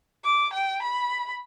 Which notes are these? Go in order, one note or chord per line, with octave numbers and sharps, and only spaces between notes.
D6
G5
B5